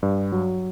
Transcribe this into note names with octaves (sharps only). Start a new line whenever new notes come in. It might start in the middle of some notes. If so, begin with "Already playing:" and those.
G2
F#3